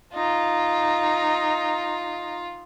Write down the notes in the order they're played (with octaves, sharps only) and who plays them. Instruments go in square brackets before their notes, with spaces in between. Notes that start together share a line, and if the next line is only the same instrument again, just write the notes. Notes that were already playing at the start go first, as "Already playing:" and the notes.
[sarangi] D#4 [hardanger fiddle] F4